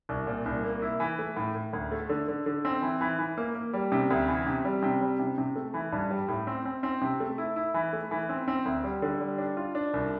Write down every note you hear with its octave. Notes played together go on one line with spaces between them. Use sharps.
C2
A#2
C2
A#3
E4
E3
A3
A2
A2
D2
A3
D3
D3
D3
C4
E3
E3
E3
A#3
A#3
G3
C3
D2
E3
C3
G3
C3
G3
C3
C3
A3
E3
G2
G3
A2
C4
C4
C4
C3
A3
E4
E4
E3
A3
E3
C4
C4
D2
G3
D3
G3
D4
F4
D4
C2